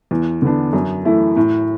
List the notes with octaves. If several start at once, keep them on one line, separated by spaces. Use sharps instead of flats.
E2
D3 B3 D4
F#2
E3 A3 E4
A2